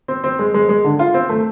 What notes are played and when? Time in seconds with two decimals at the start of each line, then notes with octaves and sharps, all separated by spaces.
0.08 C4
0.24 C4
0.39 G#3
0.54 G#3
0.69 G#3
0.84 D3
0.99 F4
1.14 C4
1.29 A3